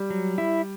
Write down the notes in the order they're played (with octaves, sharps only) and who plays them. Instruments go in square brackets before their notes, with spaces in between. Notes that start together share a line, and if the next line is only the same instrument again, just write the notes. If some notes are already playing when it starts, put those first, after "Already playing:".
Already playing: [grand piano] G3
[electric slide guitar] F#3
E4